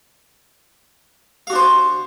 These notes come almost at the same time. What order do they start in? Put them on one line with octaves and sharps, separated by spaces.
F5 F#4 D4 C5